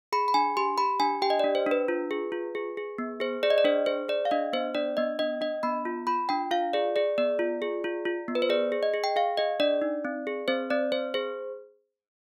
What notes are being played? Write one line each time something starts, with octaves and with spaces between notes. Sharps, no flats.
G#4 B5
B5
D4 G#5
G4 C6
G4 B5
D4 G#5
G4 G5
D#5
D4 D5
C5
D4 B4
F4
G#4
F4
G#4
G#4
B3
G#4 C5
G#4 D5
D#5
D5
D4 C5
G#4 C5
G#4 D5
F5
D4 D#5
B3 C5
D4 D5
B3 D#5
D4 D#5
D4 D#5
B3 B5
F4
F4 B5
D4 G5
F4 F5
G#4 D5
G#4 D5
B3 D5
F4
G#4
F4
F4
B3
B4
C5
G#4 D5
G#4
D#5
G#4
G5
G#4 F5
G#4 D#5
D4 D5
D#4
C4
G#4
C4 C5
C4 D5
C4 C5
G#4 C5